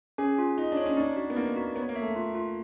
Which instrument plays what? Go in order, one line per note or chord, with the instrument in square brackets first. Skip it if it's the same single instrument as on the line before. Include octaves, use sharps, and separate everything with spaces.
[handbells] C#4 [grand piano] G#4
[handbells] F4
[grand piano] D#4 [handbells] F4
[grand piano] D4
[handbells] C#5
[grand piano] C#4
[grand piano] D4 [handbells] D#4
[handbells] F#4
[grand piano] B3
[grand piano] A#3 [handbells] D#4
[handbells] F#4
[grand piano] B3 [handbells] C#5
[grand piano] A#3
[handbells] E5
[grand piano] A3
[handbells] F4
F4